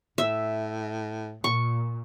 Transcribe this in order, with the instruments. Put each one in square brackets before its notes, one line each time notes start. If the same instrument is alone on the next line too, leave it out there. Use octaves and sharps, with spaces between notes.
[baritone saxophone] A2 [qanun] E5
[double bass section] A#2 [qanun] C#6